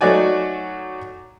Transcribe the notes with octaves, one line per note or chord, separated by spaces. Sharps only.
F#3 A3 D#4 F#4 D5 G#5